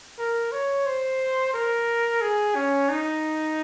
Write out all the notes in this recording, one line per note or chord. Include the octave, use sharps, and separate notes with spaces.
A#4
C#5
C5
A#4
G#4
C#4
D#4